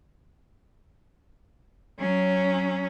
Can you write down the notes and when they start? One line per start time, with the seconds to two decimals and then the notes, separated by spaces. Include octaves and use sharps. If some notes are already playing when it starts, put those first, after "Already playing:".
2.00 F#3 C#4